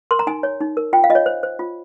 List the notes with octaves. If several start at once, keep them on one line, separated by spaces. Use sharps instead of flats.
A#4 C6
A#5
D#4 G#5
C#5
D#4
A#4
F4 G5
F5
F4 D#5
C#5
C5
C5
F4